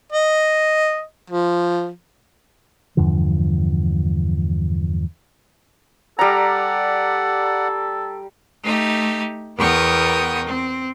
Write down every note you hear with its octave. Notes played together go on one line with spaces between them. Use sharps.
D#5
F3
E2 G2 D3 F3
G3 A4 D5 F#5 A#5
A3 D#4 G4
E2 B3 A#4 G5 C#6 D#6
C4